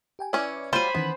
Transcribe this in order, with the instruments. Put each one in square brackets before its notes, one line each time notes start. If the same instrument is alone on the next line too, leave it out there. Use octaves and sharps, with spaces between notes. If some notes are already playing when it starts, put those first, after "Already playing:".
[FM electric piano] G4 G5 G#5
[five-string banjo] E3 C#4 E4 [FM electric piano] D5 D6
[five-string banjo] F#3 G3 F4 [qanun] C5 G#5 [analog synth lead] B5
[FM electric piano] D#3 E3 C#4 [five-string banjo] B3